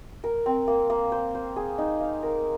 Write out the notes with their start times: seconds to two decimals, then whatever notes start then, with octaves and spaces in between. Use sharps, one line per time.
0.24 A#4
0.46 C4
0.68 A#3
0.90 A#3
1.12 C5
1.35 C5
1.56 G#4
1.78 D#4
2.01 F5
2.23 A#4